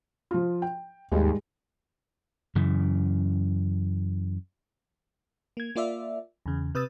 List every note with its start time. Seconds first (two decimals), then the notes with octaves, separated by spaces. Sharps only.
0.31 F3 F4
0.62 G5
1.12 D#2 G#2 G3 G#3
2.55 F#2 C#3 E3
5.57 A#3 G#6
5.76 A#3 F4 D5 E5
6.46 E2 C#3
6.75 C3 B4 D#6 E6 A6